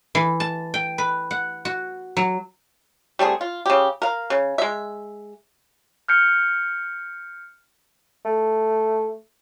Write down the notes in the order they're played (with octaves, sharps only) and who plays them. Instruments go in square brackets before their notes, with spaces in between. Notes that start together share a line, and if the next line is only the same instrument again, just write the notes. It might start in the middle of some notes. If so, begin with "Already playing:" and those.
[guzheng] E3
A5
G5
B4
F#5
F#4
F#3
[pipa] G3 A3 C4 G#4
F4
C#3 G4
A#4 F5
C#3
G#3 E5
[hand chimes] F6 G6 C#7
[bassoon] A3